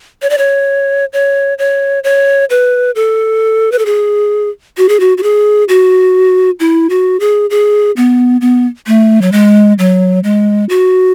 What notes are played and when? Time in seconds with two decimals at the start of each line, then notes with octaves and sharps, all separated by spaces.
0.22 C#5
0.30 D5
0.38 C#5
1.13 C#5
1.59 C#5
2.04 C#5
2.50 B4
2.95 A4
3.72 B4
3.79 A4
3.86 G#4
4.78 F#4
4.89 G#4
5.00 F#4
5.18 F#4
5.23 G#4
5.69 F#4
6.60 E4
6.90 F#4
7.20 G#4
7.50 G#4
7.97 B3
8.41 B3
8.87 A3
9.22 F#3
9.32 G#3
9.79 F#3
10.24 G#3
10.69 F#4